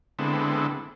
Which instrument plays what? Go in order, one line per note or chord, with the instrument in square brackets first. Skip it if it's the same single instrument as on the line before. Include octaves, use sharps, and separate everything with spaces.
[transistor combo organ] D3 G#3 B3 C4 E4 A4